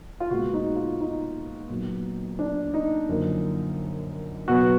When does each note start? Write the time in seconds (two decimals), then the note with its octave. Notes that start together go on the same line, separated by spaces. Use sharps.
0.20 F4
0.30 A#2 G#3 B3 F#4
0.53 D#4
0.76 F4
1.00 D#4
1.69 A#2 F#3 B3
2.39 D4
2.74 D#4
3.09 F#2 D3 F3 A#3
4.48 B2 F#3 B3 F#4